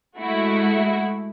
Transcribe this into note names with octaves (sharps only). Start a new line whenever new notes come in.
G#3 A3 E4 F#4